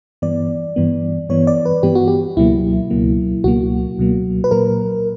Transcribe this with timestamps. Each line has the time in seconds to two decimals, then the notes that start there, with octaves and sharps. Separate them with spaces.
0.22 G2 E3 B3 D5
0.76 G2 E3 B3
1.29 G2 E3 B3 C#5
1.47 D5
1.65 B4
1.83 G2 E3 B3 G4
1.95 F#4
2.08 G4
2.36 C#2 B2 F#3 A#3 E4
2.90 C#2 B2 F#3 A#3
3.44 C#2 B2 F#3 A#3 F#4
3.98 C#2 B2 F#3 A#3
4.44 B4
4.51 A#2 F#3 A#3 A#4